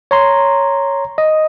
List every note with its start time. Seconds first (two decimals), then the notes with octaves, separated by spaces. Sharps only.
0.11 C#5 A#5 C6
1.18 D#5